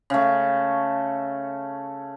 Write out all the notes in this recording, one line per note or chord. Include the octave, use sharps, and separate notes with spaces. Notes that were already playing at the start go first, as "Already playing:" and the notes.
C#3 A3